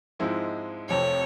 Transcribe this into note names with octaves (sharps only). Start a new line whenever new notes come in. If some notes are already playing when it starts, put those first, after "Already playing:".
G#2 F3 G#3 C4 E4
F1 F2 C3 F3 C#5